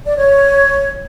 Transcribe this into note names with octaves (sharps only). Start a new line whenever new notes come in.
D5
C#5